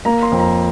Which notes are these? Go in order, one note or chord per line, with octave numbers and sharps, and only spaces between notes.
A#3 A#5
C6
F2
A#5